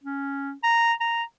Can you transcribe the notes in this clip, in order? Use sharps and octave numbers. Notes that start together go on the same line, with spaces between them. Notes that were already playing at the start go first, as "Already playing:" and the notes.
C#4
A#5
A#5